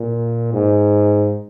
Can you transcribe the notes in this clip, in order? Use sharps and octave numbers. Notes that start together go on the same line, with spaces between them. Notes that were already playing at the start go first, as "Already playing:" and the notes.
Already playing: A#2
G#2